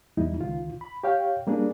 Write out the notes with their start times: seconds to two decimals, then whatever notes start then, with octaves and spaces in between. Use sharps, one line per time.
0.17 E2 G3 D#4 E4
0.41 C#2 D#3 F4
0.81 B5
1.03 G4 C#5 F5 G5
1.47 G3 A#3 C#4 D4 G#4